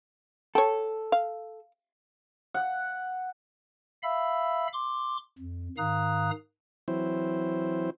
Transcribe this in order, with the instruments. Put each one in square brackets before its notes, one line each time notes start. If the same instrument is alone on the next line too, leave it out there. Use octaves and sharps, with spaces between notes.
[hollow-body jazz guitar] A4 [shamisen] C#5 G5
[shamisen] F5
[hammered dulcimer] F#5
[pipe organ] E5 F5 B5 E6
C6 D6
F2
G#2 D#3 F5 A#5 D#6 F#6
[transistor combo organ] E3 F#3 C4 E4 C5